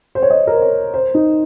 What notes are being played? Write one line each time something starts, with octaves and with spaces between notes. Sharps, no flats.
C5
C#5
D#5
A#4
C5
C#5
C5
D#4